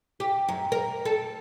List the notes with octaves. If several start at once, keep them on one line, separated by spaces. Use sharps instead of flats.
G4
F#2
A#4
A4